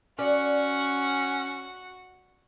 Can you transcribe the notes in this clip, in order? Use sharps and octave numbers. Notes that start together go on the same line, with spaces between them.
C#4 F#4 D5 F#5